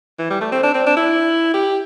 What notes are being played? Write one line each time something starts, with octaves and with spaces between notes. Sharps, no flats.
E3
G3
A3
C4
D4
C4
D4
E4
G4